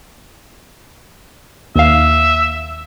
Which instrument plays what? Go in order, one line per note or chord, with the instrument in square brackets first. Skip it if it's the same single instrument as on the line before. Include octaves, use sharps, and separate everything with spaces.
[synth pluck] D#2 F5 [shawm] E5